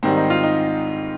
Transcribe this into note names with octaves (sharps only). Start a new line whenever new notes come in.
G#2 D#3 G3 C4
D#4
F4
D#4